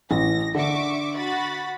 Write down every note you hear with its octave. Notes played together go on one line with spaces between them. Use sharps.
A1 A#6
D3 E5 C#6 D6
F#4 B5 A6